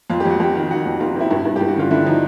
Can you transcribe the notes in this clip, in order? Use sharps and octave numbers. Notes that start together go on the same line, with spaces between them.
F2 F4
G4
F2 F#4
F2 G4
D#3
D#3 F#4
F2
C3 F4
C3 E4
G2
G2
G2 G4
F#4
D3 F4
D3 E4
F3 D#4